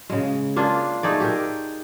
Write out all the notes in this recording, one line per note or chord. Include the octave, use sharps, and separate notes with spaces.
C#3 G#3
A#3 D4 F4 G#4
A3 D#4 G#4 D5
G4 G#4 A#4